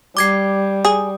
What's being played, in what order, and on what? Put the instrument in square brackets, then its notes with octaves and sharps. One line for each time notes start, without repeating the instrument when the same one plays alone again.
[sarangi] G3 [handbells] D6 G#6 C7
[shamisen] G#4 [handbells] D#6